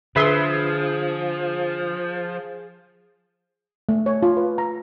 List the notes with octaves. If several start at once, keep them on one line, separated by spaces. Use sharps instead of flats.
D3 F3 G#4 B4 E5 C6
A3
C#5
F4
B4
A#5